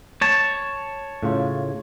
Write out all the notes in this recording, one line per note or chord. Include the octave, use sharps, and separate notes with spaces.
C#5 A5
A2 C#3 F4